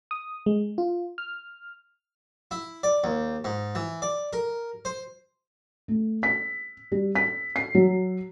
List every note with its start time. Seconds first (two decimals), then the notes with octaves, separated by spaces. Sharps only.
0.11 D#6
0.46 G#3
0.78 F4
1.18 F6
2.51 E4
2.83 D5
3.04 D#2
3.44 G#2
3.75 E3
4.02 D5
4.33 A#4
4.85 C5
5.88 A3
6.23 B6
6.92 G3
7.15 B6
7.56 C7
7.75 F#3